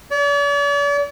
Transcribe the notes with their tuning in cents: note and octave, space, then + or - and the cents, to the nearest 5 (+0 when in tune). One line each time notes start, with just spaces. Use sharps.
D5 -45